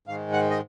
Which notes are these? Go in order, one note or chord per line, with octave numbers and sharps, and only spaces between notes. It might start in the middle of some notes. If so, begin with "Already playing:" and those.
G#2 D#3 G#3 F5
F#5
D#5